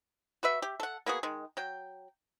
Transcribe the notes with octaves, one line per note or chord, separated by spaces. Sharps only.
F#4 B4 E5
G4
A4 F#5
A#3 B3 F#4 G#4
D#3 G#3
F#3 G5